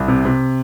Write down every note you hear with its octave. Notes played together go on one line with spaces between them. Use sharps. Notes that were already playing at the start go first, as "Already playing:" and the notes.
Already playing: C2
C3
C3